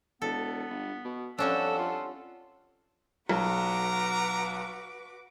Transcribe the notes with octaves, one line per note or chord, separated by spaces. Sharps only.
E1 B3 A4
G1
B2
F2 G3 C#4 D4 A4 F#5 E6
F4
B1 F#4 B4 A#5 D6